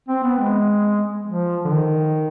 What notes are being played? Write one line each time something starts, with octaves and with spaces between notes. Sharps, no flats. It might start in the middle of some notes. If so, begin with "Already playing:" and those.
C4
B3
G#3
F3
D3
D#3